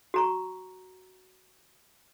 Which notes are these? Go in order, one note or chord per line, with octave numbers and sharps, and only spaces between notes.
F#4 A#5 C#6